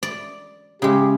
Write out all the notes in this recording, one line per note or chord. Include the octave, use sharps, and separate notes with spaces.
D5
C#3 G#3 G4